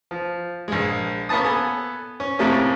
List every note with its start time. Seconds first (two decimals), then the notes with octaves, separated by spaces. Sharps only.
0.11 F3
0.68 A#1 G#3
1.29 A#3 B3 C#4 B4 A5 D#6
1.44 B3 A4 G#5
2.20 C#4
2.39 F2 A2 C3 A3 A#3 C#4